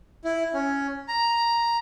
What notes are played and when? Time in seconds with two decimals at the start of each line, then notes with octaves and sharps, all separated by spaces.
0.24 E4
0.54 C#4
1.08 A#5